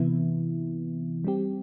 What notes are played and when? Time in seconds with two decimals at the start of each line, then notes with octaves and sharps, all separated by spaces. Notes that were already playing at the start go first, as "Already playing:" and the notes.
Already playing: C3 E3 B3 E4
1.24 G3 C4 G4